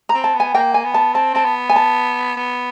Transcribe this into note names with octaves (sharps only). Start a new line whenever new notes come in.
A#5
C4
A5
B3
G#5
A#3 G5
G#5
B3
A5
C4 A5
C4 A5
B3
G#5
A5
B3